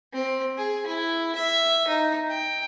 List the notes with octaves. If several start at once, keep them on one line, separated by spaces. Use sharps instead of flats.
C4
G#4
E4
E5
D#4
G5